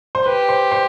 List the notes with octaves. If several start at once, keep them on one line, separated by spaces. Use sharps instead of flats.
C5
G4 B4
C5
C5